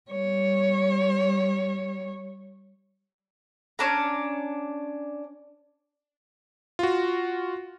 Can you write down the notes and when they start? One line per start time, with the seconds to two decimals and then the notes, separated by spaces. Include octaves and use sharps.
0.10 G3 C#5
3.79 C#4 D4 A#5
6.79 F4 F#4